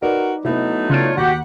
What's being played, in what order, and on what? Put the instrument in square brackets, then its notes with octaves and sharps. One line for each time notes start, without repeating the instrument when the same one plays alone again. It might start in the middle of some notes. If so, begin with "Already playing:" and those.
[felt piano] D#4 B4 D5 [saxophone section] F#4 A#4
[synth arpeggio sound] C3 [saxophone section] F#3 A3 D#4 [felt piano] B3 E4
[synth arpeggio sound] C#3 F6 D7 [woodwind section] D4 F4 C#5
[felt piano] D#2 [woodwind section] F#4 G4 [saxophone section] F#5